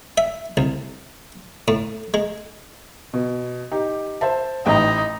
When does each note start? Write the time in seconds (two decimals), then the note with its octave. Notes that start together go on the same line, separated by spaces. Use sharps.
0.18 E5
0.57 C2
1.68 A2
2.14 G#3
3.13 B2
3.72 D#4 G4
4.21 C5 E5 A5
4.66 A1 A2 D#4 G5